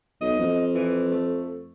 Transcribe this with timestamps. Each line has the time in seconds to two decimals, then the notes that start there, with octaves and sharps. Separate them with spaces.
0.21 B1 D#5
0.39 F2
0.75 E3
1.11 A3